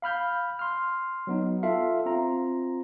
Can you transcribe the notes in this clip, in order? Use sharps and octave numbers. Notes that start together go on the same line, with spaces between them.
F5 B5 F6 G6
C6 F6
F#3 B3 D#4
F4 A4 E5 F5
C4 F4 A#5